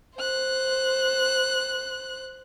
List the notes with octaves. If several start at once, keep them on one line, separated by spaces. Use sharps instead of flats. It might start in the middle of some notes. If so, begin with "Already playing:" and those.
C5 F#6